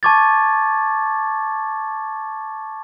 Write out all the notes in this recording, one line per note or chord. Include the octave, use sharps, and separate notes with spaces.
A5 C#6 D6 G#6 A6